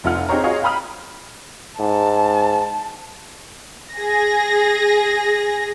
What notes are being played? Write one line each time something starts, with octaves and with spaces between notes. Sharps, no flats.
F1 F2 E4 F4 F#5 F6
C4 D#4 G4 G#4 C#5 A#5
F4 F#4 G#4 C#5 D#5 F5
F5 G5 A#5 B5 D#6 F6
G#2 A5
G#4 A#6